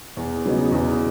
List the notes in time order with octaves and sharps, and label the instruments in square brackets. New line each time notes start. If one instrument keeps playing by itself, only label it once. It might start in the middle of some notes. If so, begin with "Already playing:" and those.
[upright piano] E2
C#3 F#3 B3 D#4
E2